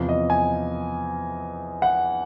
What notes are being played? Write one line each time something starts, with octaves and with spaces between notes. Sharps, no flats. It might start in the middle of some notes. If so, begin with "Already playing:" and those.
Already playing: E2 C3 F3
D#5
G#5
F#5